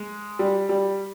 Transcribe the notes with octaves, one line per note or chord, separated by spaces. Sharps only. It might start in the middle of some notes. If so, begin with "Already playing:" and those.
Already playing: G#3
G3
G3